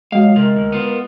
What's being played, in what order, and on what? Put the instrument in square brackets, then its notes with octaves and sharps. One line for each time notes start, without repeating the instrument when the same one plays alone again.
[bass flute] F#3 [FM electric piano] G#3 D#5 [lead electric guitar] F5
[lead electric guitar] C3 F4 [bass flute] A#4
[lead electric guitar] D2
B3 F4